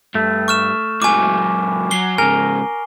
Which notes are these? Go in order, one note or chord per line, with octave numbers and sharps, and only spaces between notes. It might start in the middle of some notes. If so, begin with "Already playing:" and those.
G2 A3
C#6 F6 E7
C#2 F#3 G#5 D6
F#3 C7 G7
G#2 C#3 A#4 G#5